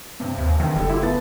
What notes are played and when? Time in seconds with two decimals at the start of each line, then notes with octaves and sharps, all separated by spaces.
0.20 G2 C3
0.38 D#2
0.60 E2 D3 D#3
0.76 F#1 G3 G4 A4
0.89 A3 E4 F4 D6
1.03 B3 A5 A6